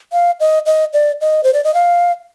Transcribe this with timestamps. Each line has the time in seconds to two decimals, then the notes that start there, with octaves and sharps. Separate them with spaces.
0.12 F5
0.40 D#5
0.66 D#5
0.93 D5
1.21 D#5
1.44 C5
1.53 D5
1.64 D#5
1.74 F5